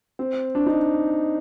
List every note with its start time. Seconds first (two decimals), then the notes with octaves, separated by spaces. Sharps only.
0.19 C4
0.55 D4
0.66 D#4